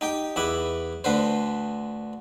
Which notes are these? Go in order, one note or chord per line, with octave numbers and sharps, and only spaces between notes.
D#4 G4 G5
E2 E4 B4 D6
D2 D3 B4 C5